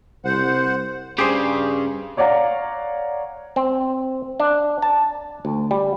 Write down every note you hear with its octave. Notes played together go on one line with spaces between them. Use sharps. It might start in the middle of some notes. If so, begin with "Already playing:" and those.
C2 C5 F#5
G2 C#3 G4 G#4 C5
C#5 D5 F5 F#5 A#5
C4
D4
A5
D2
G3